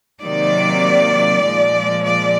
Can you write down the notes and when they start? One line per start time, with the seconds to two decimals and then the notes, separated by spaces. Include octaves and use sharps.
0.21 C3 D#3 F#3 A#3 D5
1.43 A#2 F3 G#3
2.03 D5